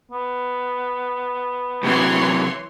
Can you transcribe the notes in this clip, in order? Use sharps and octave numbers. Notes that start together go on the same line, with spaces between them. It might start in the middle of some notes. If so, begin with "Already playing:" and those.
B3
F#2 C3 E3 F#3 C#5 C6